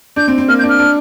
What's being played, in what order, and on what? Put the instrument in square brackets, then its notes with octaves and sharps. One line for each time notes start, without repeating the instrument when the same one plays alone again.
[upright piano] D4 [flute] G6
[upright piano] C4
C4
[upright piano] A#3 [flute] F6
[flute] G6
[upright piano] D4
[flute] F6
[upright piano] D4